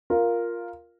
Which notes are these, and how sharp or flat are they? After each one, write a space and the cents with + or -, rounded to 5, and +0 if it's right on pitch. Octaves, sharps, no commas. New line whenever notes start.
F4 +0 A#4 +0